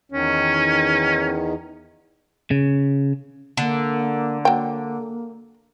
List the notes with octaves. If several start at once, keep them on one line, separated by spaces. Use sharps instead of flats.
E2 D#3 C#4
C#3
D3 A#3
F#3 A#3 G5